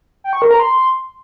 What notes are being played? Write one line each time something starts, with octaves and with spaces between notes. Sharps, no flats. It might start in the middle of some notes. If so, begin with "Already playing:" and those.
G5
C#6
A#4
A#5
C6